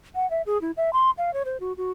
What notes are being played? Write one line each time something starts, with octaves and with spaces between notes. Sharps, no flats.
F#5
E5
G#4
E4
E5
C6
F5
C#5
C5
F#4
F#4